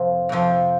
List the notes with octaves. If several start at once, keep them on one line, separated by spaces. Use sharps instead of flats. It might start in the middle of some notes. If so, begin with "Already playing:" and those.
Already playing: F2 C3 F3
F2 C3 F3